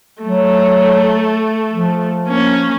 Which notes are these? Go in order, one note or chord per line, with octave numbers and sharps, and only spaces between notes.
F#3 A3
F3
A#3 C#4